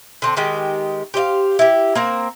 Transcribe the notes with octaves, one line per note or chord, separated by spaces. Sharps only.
D3 C4 A5
D#3 G#3 G4
G4 C5 D#5 F5
E4 G4
A#3 C4 A#4